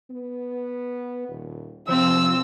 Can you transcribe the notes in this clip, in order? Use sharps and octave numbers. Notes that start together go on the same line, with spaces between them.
B3
D#1
C3 F3 C4 E6